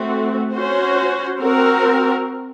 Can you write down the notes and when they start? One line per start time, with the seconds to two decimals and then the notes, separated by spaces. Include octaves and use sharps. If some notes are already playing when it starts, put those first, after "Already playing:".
Already playing: A3 C4 F#4
0.54 C#4 F#4 C5
1.40 C4 F#4 A#4